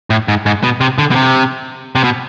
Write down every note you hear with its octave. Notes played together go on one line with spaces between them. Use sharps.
A2
G#2
G#2
B2
C3
D3
B2
C3
C3
B2